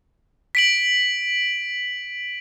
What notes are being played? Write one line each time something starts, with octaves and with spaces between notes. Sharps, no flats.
B6 D7 F#7